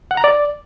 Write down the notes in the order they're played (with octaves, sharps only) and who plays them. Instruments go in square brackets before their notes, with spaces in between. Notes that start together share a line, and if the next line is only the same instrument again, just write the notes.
[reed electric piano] F#5
A#5
D5